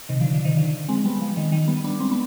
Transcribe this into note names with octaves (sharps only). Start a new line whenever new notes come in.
C3 D#3
D3 F3
D3 F3
C3 D#3
D3 F3
G#3 C4
G3 B3
F3 G#3
D#3 G3
D#3 G3
G3 B3
B3 D4
G#3 C4
B3